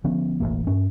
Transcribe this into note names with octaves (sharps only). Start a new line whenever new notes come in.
D3 F3 B3 C#4
E1 A1 G#2 A#3
G2 C#4